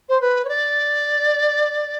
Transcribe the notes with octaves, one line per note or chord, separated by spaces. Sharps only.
C5
B4
C#5
D5